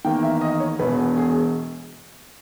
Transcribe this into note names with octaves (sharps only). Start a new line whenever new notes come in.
E2 D#3 A#3 G5
E5
D#5
C#5
E1 E2 B2 B4
G#4